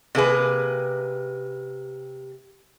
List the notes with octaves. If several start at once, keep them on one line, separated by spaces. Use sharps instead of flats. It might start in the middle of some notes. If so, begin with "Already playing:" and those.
C3 A#3 G#4 B4